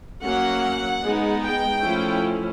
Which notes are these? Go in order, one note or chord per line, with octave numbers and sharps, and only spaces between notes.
F#3 A#3 C#4 F#5
G#3 B3 D#4
G5
F3 A3 C#4 E4